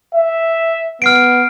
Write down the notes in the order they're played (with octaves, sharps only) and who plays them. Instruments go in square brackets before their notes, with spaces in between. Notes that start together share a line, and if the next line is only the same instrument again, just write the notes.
[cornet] E5
[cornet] B3 [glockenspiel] F6 C7 D7